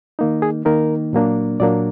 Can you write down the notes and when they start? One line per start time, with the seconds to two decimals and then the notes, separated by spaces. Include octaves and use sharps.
0.19 D#3 A#3 D#4
0.42 G#4
0.65 D#3 A#3 D#4 A#4
1.13 A#2 F#3 A#3 D4
1.60 A#2 F#3 A#3 D4 D5